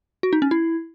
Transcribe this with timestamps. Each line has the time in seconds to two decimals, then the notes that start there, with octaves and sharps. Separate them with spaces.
0.23 F#4
0.33 D#4
0.42 C#4
0.51 E4